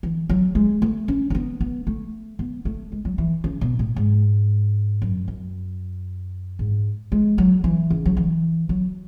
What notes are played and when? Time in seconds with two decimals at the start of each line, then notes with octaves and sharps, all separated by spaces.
0.03 E3
0.29 F#3
0.55 G#3
0.82 A3
1.08 C#4
1.30 C#4
1.35 B3
1.60 B3
1.87 A3
2.39 B3
2.65 A3
2.92 G#3
3.05 F#3
3.18 E3
3.44 C#3
3.61 B2
3.79 A2
3.96 G#2
5.02 F#2
5.28 F#2
6.59 G#2
7.12 G#3
7.38 F#3
7.64 E3
7.90 C#3
8.05 F#3
8.17 E3
8.69 F#3